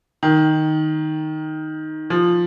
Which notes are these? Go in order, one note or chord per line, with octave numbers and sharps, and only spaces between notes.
D#3
F3